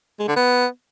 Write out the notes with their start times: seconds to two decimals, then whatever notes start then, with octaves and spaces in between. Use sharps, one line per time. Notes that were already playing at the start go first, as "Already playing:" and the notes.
0.20 G#3
0.28 D3
0.36 B3